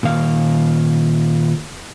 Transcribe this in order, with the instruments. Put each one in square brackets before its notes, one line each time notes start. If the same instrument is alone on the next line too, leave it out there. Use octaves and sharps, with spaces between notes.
[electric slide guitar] A#2 D#3 F5